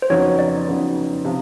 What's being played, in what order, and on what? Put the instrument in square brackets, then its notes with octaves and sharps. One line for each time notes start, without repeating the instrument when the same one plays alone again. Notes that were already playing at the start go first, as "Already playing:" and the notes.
[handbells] C5
[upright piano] F2 C#3 F#3 B3 D#4 [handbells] C#5
[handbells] D5
[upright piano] F2 C#3 F#3 B3 D#4
C3 F3